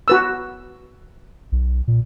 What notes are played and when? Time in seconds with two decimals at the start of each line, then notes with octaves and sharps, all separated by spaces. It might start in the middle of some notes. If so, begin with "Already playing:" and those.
0.08 F#4 B4 E6
1.52 B1
1.88 A#2